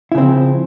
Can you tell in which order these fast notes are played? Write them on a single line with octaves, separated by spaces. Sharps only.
E4 C#3 C4 F3